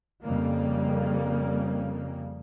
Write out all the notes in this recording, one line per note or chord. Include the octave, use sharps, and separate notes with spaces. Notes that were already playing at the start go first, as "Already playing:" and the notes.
F2 C#3 G3 A#3